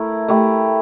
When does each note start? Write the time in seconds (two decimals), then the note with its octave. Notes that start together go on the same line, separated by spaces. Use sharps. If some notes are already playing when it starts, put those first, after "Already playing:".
Already playing: A3 E4 A#4
0.28 A3 E4 G4